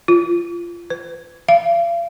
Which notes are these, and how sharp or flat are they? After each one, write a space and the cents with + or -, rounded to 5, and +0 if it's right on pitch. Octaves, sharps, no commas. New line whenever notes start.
F4 -15
B4 +30
F5 -40